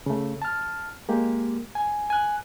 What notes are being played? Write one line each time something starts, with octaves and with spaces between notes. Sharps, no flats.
C#3 A3
A5 F6
G#3 A#3 G4
G#5
G#5 F#6